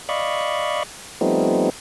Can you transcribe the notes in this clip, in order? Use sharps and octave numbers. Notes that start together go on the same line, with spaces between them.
D5 D#5 F5 B5 C#6
F3 G3 A3 B3 C4 D#4